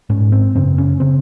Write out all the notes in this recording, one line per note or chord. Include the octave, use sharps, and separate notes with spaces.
G#2 C#4
C4
F#2 C#3 C4
C#4
C#3 C4